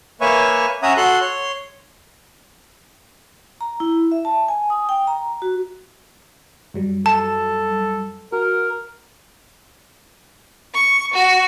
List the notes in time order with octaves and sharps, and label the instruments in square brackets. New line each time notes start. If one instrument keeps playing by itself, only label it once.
[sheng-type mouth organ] A#3 B4 C#5 E5 G#5 C#6
C#4 C#5 E5 F#5 A#5 D#6
F#4 A4 C6 F#6
C#5 C6
[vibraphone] A#5
E4
E5
A5
G#5
D#6
G5
A#5
F#4
[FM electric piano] F#2 F#3 G3
[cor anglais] A4 [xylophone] A5
[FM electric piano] F#4 [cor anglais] A#4
[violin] C#6
F#4